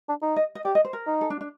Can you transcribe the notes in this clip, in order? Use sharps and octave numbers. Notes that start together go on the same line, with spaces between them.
D4
D#4
D#5
D#5
G4 D5
D#5
C5
A#4
D#4
A4
D4
D4